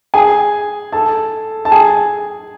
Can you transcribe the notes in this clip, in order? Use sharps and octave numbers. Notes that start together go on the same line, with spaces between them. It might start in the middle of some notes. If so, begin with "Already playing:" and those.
G#4 G#5
A4 A5
A5
G#4 G#5